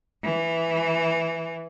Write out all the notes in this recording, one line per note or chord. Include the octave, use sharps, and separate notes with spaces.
E3